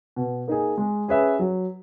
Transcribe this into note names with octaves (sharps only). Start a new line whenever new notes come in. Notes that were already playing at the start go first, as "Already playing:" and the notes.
B2
A#3 D#4 G#4
G#3
C#4 G#4 B4 E5
F#3